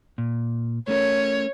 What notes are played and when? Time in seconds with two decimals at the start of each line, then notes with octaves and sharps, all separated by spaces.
0.18 A#2
0.88 A3 C#4 A#4 C#5